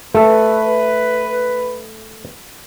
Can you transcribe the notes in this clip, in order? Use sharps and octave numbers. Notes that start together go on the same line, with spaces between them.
A3 A4 B4